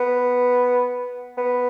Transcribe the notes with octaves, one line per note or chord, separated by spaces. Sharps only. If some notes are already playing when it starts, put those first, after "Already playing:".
Already playing: B3
B3